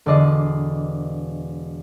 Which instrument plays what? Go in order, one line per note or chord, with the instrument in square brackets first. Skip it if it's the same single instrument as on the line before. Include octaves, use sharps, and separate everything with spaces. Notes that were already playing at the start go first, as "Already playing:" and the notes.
[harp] E1 D3 D5 D#5 C7